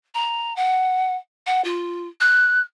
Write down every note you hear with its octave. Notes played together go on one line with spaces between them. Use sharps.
A#5
F#5
F#5
F4
F#6